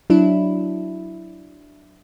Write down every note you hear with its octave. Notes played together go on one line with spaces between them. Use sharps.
F#3 D4 E4